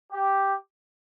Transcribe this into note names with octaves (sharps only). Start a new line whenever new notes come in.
G4